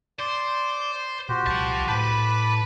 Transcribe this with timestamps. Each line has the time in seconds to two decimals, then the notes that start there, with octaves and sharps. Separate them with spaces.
0.19 C5 D5
1.29 A#2 F#4 G4 C5
1.46 C2 F3 A5
1.89 A2 B4 A5 B5 D6